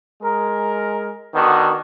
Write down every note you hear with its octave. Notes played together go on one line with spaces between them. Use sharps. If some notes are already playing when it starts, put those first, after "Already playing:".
G#3 A#4
D3 D#3 B3 F#4